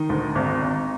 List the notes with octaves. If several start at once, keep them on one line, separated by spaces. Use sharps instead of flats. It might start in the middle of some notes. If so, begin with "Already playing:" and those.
Already playing: D#3 D#4
D2
G#1
G#1